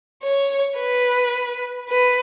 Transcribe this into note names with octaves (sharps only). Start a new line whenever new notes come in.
C#5
B4
B4